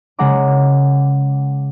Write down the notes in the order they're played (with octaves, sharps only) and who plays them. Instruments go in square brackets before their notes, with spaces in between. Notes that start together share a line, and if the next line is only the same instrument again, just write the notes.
[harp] C#3 G#3 G#4 F#5 A#5 D6